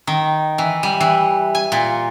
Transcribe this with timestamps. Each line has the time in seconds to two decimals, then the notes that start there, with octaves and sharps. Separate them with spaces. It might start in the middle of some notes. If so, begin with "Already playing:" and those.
0.07 D#3
0.58 E3
0.83 G3
1.01 E3
1.55 G#5
1.72 A#2